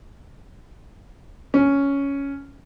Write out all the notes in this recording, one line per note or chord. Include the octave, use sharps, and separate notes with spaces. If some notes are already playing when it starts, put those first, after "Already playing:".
C#4